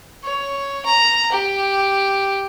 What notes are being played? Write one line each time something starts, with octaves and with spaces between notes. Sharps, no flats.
C#5
A#5
G4